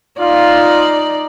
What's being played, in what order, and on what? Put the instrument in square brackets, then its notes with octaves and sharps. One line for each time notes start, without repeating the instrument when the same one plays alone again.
[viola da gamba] D#4 D5 [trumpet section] F4